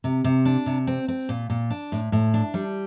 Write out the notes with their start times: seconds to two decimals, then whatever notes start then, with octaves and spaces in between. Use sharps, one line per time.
0.04 C3
0.24 C3
0.45 D4
0.66 C3
0.87 C4
1.08 C4
1.29 A#2
1.50 A#2
1.70 D4
1.92 A2
2.12 A2
2.34 D4
2.54 G3